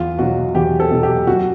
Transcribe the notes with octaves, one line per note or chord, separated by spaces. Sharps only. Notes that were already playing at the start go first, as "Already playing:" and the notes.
Already playing: E2 F4
B2 F#3 F#4
E2 G4
A4
B2 F#3
G4
F#2 F#4